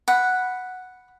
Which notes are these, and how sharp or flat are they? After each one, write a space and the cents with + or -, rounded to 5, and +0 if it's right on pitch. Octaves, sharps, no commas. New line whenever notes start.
F#5 +0 B5 +0